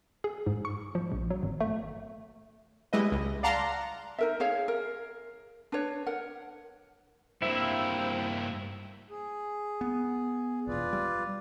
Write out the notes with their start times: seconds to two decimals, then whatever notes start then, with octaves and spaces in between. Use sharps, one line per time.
0.24 G#4
0.46 G#2
0.65 C#6
0.95 F3
1.12 A#1
1.31 F#3
1.43 G#1
1.61 A3
2.93 G3 G#3 E4 B4 D#5
3.12 C#2
3.43 D5 F5 F#5 A5 A#5 C6
4.19 D#4 A#4 E5
4.40 G#4 C#5 F5
4.68 A#4
5.72 D4 B4 C#5
6.06 A#4 F#5
7.42 G2 A#3 C4 E4 E5
9.10 G#4
9.81 B3
10.67 E1 A#1 F4 B4 D5
10.93 G3